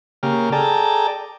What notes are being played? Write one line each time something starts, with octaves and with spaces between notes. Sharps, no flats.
C#3 A#3 G4 F6
G#4 A4 D5 G5 A5 A#5